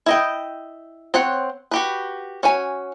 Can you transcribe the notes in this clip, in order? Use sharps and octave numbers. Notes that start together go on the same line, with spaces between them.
E4 D#5 G5
C4 C5 C#5 F#5
F#4 G4 B4
C#4 F#4 G#5